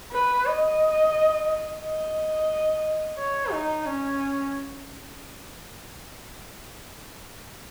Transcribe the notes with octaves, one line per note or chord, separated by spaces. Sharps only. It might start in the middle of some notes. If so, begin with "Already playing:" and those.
B4
D#5
D#5
C#5
D#4
C#4